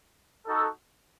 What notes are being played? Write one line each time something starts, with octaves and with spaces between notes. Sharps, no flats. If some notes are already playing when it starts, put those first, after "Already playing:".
D#4 F#4 A4